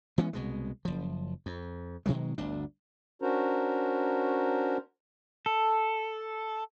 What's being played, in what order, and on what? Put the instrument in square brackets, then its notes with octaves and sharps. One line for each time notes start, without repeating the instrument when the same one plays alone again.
[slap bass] E3 G#3 B3 C#4
C2 B2 G#3
F#1 F3
F2
B2 D#3 F#3 G#3
G1 D2 D4
[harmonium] C#4 D4 F#4 A#4 C5 A#5
[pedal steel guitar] A4